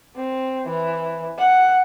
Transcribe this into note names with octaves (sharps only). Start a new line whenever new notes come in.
C4
E3
F#5